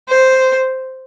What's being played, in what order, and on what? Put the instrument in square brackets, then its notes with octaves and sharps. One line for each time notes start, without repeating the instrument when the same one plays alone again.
[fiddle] C5